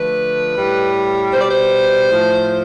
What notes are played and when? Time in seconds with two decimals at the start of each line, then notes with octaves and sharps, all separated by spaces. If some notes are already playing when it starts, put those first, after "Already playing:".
Already playing: D3 F3 A3 B4
0.57 A2 G3
1.33 B2 G3 C5
1.41 D5
1.50 C5
2.10 A2 F3 A3